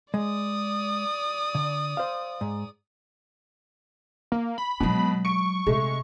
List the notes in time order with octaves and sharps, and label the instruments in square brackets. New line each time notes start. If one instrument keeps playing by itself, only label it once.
[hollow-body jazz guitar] G#3 [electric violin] D5 D#6
[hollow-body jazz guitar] D3
C5 F5
G#2
[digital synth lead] A#3
B5
[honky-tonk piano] B2 [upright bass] F#3 G#3
[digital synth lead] C#6 [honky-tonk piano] C#7 D7
[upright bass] C3 [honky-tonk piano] G#3 A3